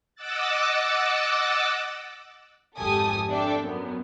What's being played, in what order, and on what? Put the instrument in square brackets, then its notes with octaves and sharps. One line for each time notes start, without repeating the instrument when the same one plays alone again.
[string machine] D#5 F#5 D6 E6 F#6 A6
[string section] G#1 F2 G4 A4 G#5 D#6
C4 D4 A4 D5 E5 G5
F#2 B3